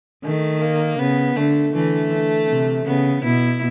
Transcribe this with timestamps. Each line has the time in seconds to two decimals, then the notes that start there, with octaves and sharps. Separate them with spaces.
0.24 D#3 A3
0.61 A#3
0.99 C#3 B3
1.36 D3 A3
1.73 D3 E3 A3
2.49 C3
2.86 C#3 B3
3.24 B2 E4